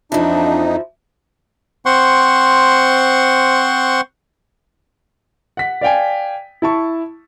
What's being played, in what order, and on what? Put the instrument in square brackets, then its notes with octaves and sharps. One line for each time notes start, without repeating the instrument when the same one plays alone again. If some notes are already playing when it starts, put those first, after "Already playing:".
[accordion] F2 D#4 [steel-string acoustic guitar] E3 F3 [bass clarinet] D4
[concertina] C4 C5 F#5 C6 C#6
[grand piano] F#5 B6
D5 F5 G5 G#5
E4 A5 C#6